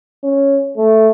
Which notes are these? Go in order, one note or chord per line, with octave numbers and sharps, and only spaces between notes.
C#4
A3